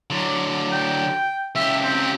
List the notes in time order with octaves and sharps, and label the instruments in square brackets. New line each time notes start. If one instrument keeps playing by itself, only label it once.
[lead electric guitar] D3 F#3
[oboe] G5
[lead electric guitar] C#2 G4 [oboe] E5
[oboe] C4